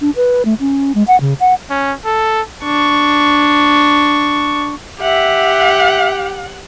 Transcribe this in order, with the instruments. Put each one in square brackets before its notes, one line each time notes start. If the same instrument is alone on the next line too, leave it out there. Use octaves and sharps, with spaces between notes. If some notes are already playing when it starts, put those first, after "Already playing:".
[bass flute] D4
B4
A3
C#4
G#3
F#5
C#3
F#5
[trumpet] C#4
A4
[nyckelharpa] D4 C#6
[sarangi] G4 [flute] E5 [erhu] F#5